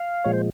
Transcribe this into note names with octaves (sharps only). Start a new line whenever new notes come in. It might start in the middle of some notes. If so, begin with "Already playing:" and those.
Already playing: F5
A#2 F3 G#3 C#5
C5